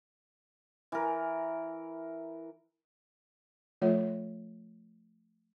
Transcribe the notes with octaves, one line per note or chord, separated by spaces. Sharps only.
E3 A#4
F3 A3 F4 A4 C#5 E5